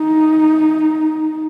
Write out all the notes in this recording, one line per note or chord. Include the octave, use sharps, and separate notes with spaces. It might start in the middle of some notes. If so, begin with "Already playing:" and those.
Already playing: D#4